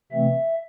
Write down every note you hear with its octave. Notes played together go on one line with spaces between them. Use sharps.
C3 E3 A3 C4 E5